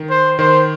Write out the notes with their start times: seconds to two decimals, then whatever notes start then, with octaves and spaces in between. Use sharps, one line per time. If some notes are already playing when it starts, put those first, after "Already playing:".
Already playing: D#3
0.10 C5
0.39 D#3 C5